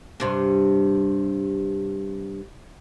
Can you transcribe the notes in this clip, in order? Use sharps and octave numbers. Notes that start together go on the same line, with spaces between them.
G2 C3 D4